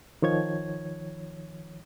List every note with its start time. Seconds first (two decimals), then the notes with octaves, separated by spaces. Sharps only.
0.22 D#3 F3 C#5 G#6